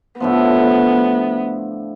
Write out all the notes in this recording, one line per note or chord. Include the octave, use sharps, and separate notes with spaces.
A2 D3 F3 B3